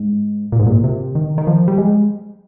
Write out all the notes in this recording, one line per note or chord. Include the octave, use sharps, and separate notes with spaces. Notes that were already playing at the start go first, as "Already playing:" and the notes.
Already playing: G#2
A#2
G#2
A#2
C3
D#3
D#3
F3
G3
G#3